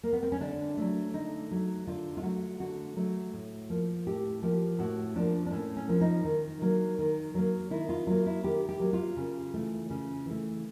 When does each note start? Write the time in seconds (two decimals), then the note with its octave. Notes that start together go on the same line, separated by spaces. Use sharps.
0.03 A#3
0.13 B3
0.23 C4
0.32 C#4
0.41 D3 D4
0.77 F#3 A3
1.14 D3 D#4
1.51 F#3 A3
1.87 D3 F4
2.17 F4
2.23 F#3 A3 F#4
2.60 D3 F#4
2.96 F#3 A3
3.33 A2
3.70 F3 A#3
4.06 A2 G4
4.42 F3 A#3 G4
4.79 A2 F#4
5.15 F3 A#3 D4
5.46 D4
5.52 A2 C#4
5.77 C#4
5.88 F3 A#3
6.01 D#4
6.25 D#3
6.62 F#3 A#3
6.99 D#3
7.35 F#3 A#3
7.70 D#3 E4
7.89 F4
8.07 F#3 A#3 F4
8.26 E4
8.44 D#3 G4
8.69 G4
8.80 F#3 A#3
8.93 F4
9.17 C#3
9.54 E3 A3
9.90 C#3
10.26 E3 A3